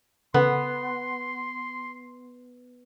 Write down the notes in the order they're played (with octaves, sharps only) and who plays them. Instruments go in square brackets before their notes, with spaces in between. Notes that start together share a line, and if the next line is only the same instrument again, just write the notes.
[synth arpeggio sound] C#3 A4 B4 [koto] B3 [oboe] C6